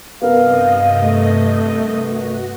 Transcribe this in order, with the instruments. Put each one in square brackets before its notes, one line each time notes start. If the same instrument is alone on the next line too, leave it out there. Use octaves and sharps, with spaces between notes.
[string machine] G2 C3 D#5 [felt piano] B3 A#4 [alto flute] F5
[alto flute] A3
[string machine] F#4